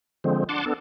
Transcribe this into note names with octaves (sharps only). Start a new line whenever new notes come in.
D3 F3 G#3 C4
D4 F#5 A5 C6 D6
B3 D4 A4